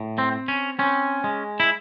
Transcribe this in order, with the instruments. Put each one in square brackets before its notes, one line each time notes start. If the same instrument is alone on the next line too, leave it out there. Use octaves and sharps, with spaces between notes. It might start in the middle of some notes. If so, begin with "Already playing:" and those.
Already playing: [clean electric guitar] A2
C4
C4
C#4
C4 C#4
G#3
E4